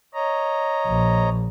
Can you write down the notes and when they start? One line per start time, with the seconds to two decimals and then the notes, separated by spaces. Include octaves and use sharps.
0.14 C#5 D#5 A#5
0.86 A#1